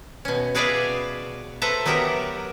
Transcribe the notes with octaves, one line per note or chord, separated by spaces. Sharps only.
B2 C#4
F#4 G#4 B4 D5 E5 F5
A4 B4 C5 E5 A5 A#5
F#3 B3 F#4 G4 A#4 E5